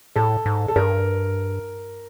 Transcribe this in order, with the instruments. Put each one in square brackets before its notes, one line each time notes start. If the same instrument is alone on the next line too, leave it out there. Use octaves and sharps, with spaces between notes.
[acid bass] A2 [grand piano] A4
[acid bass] G#2
[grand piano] A4
[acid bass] G2 [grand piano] A#4